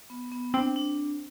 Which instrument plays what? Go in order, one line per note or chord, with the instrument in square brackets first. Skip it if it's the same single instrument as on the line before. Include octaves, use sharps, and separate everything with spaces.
[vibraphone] B3
B3
[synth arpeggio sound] C4 [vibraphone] D4
[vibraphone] D4